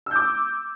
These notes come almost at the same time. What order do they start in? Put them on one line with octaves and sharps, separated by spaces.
E6 G6 D6